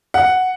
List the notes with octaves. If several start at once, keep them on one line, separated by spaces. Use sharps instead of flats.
F#5